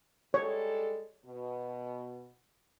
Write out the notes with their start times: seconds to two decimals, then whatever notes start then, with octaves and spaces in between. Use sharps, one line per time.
0.34 G3 G#3 A4 C#5
1.25 B2